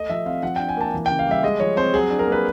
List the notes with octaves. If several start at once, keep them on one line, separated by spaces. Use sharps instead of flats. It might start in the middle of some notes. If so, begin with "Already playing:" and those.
Already playing: A3 D#5
F3 E5
C4 F5
F3 F#5
D4 G5
G#5
A#3 A5
E3
G5
C#3
F5
G3 E5
G#3 D#5
F3 C#5
C4 C5
F#3 G#4
D4
A#4
A#3 B4